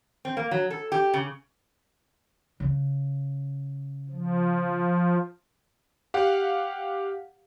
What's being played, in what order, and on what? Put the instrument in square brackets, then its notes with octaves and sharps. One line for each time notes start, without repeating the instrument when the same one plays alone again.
[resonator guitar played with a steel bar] C4
A#3
F#3
A4
G4
C#3
[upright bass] C#3
[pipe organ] F3
[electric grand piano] G4 F5 F#5